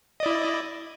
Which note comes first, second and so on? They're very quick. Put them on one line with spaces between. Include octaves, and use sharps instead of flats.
D#5 D5 E4